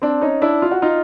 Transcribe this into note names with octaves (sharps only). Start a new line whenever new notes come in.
C4 D4
C#4 D#4
D4 E4
F4
F#4
D#4 F4